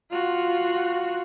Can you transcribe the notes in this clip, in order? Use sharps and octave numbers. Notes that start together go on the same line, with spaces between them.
F4 F#4